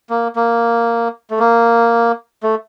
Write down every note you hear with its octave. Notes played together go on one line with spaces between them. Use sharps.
A#3
A#3
A3
A#3
A3